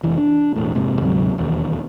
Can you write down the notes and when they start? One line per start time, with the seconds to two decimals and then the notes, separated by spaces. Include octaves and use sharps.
0.03 F1 E3
0.18 D4
0.56 E1 A2
0.75 F1 G#2 C3
1.01 D2 G#2 C3 F#3
1.38 E1 D#2